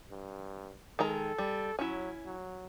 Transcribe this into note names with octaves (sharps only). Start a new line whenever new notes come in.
G2
D#3 G#3 A4 A#5
G3
F#3 C#4 E4
F#3